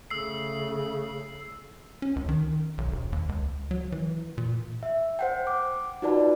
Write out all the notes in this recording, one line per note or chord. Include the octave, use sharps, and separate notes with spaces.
C#3 A3 E6 C7
C#4
C#2
D#3
B1
E1
D#2
C#2
F#3
E3
A#2
E5
C5 F#5 G5
D6
D#4 F4 F#4 B4 D5 A5